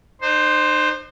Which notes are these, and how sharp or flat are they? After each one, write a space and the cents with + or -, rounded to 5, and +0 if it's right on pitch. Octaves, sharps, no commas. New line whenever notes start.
D#4 -45 C5 +0